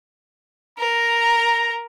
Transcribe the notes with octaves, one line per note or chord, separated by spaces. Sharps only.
A#4 A#5